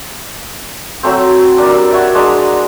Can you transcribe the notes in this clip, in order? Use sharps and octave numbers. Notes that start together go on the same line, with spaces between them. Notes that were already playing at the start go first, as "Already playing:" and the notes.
F#3 A3 C4
D4 A#4 D5
G3 E6
F#4 C#5 E5
G#3 D4 A#5